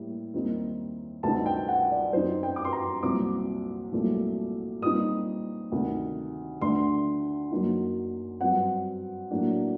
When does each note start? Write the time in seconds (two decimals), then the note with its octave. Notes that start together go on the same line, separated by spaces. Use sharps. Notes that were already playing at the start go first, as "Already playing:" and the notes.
Already playing: A2 G3 A#3
0.34 D#2 D#3 G3 C4 D#4
1.23 D2 C3 G3 C4 D#4 A5
1.46 G5
1.68 F#5
1.91 D5
2.13 F#2 F#3 C4 D#4 C5
2.43 G5
2.56 D6
2.65 C6
2.73 A#5
3.03 C2 A#2 F#3 C4 D6
3.92 C2 A#2 F#3 A3
4.82 A#2 G3 C4 D#4 D#6
5.72 D2 C3 D#3
6.61 D2 D3 A3 D4 C6
7.51 F#2 F#3 A#3 D#4
8.41 G2 F#3 C4 F#5
9.30 A2 F#3 A#3 D4